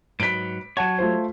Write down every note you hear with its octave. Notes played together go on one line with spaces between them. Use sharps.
G#2 F#3 B4 B6 D7
F#3 C#5 F#5 A5
A3 F4 C5